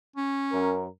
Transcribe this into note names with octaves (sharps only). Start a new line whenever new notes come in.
C#4
F#2 A#4